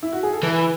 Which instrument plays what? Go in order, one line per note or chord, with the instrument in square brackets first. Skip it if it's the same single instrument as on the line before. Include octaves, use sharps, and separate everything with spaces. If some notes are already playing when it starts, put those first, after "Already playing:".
[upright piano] E4
F#4
G#4
A4
[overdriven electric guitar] E3 [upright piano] B4